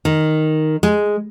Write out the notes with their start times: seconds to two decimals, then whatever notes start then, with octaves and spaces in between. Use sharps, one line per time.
0.05 D#3
0.83 G#3